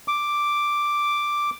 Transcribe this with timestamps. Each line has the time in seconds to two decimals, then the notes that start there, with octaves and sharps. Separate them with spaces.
0.08 D6